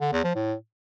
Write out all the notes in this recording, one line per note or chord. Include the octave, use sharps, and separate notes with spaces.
D3
E2
F3
A2